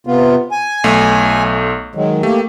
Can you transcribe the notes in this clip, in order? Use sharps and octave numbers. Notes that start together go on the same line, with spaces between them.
C3 B3 F4
G#5
B1 A3
D#3 F#3 G#3
A3 A#3 G4